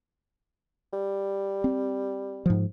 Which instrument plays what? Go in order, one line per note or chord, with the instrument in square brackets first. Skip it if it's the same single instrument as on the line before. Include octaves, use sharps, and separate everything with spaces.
[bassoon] G3
[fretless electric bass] C4
G#2 F3